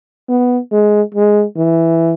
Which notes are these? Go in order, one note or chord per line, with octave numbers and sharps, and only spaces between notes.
B3
G#3
G#3
E3